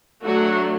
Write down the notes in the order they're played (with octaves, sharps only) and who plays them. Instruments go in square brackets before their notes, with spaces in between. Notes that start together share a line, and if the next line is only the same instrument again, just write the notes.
[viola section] F#3 A3 D4 F#4